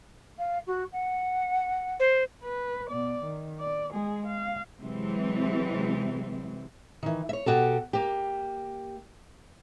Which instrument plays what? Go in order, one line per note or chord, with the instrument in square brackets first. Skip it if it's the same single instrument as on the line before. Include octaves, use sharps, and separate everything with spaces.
[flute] F5
F#4
F#5
[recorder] C5
[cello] B4
B2 D5
D#3
D5
G#3 G#4
F5
[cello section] C3 E3 F#3 G#3 C4
[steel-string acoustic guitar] D#3 E3
C#5 E5
B2 F#4 G4 A4
A#3 G4